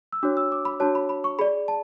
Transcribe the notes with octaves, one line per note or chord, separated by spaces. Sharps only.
E6
D4 F#4 C#5 D6
E6
D6
B5
D4 F#4 C#5 A5
B5
B5
C#6
G#4 D5 B5
A5